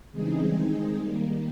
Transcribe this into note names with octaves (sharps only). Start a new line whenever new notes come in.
C#3 E3 G3 G#3 C4 D#4 G#4
D#3 G#3 C4 D#4
D#3 G3 A#3